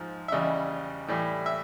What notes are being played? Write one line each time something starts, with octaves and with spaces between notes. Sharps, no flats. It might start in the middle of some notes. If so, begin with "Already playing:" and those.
Already playing: G#2 F3
E5
E2 C#3 E3 G3 D#5
A2 E3 G3
E5